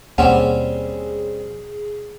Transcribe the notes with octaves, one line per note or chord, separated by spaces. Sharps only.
D#2 B2 G3 A#3 C4 C#4 G#4 F#5